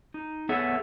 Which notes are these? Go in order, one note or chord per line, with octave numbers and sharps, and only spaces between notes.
D#4
B3 G#4 A4 C#5 E5 F#5